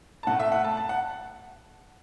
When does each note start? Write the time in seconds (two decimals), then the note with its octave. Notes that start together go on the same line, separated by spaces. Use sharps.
0.23 A5
0.27 A2 A3 F#5
0.40 E5
0.52 F#5
0.64 A5
0.77 A5
0.89 F#5